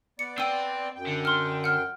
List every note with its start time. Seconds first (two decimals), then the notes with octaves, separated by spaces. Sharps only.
0.19 B3 D5 C#7
0.38 C4 G5 E6 D#7
0.96 F#2 G5
1.07 D3
1.25 C6 F6
1.64 F#5 F6